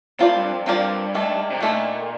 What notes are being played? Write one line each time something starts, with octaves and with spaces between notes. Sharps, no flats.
A2 C4 F4 A#4 D5
G2
F2
G2 C4 F4 A#4 D5
D#3 A3 D4
C3
A#2 D#3 A3 D4